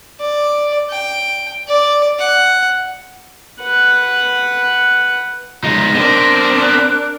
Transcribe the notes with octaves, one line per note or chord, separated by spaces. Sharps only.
D5
G5
D5
F#5
B4 F#5
F3 G#3 B3 D#4 A#6
B3 C4 D4 A#4 C5
F#6